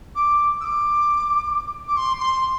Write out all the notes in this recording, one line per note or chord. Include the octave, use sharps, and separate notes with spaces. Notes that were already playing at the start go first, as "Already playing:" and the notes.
D6
E6
D6
D6
C6
C6